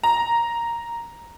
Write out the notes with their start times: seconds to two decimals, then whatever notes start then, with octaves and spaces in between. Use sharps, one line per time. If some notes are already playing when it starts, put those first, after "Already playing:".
0.03 A#5